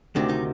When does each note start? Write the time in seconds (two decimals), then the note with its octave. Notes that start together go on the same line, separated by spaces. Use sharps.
0.16 D2 C3 D#3 D4
0.29 D#4